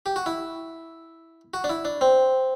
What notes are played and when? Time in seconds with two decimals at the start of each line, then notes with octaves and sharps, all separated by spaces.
0.06 G4
0.16 F#4
0.26 E4
1.54 F#4
1.64 D4
1.69 E4
1.85 D4
2.01 C4